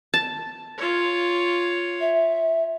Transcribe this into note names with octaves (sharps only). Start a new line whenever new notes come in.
A5
F4 C#5
E5